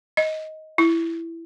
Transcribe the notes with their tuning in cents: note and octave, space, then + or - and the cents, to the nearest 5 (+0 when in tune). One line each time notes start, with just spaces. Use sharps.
D#5 +15
E4 +10